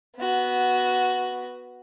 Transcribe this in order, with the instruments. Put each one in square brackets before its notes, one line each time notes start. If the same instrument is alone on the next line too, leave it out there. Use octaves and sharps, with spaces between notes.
[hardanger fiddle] B3 F#4